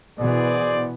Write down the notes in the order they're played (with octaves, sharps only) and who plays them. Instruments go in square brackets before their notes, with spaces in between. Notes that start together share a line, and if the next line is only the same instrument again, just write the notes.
[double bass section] B2 E3 B3 [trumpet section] G#4 C5 D5